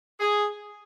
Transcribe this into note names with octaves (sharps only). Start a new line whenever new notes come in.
G#4